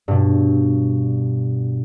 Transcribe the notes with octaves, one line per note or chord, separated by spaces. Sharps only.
G2 B2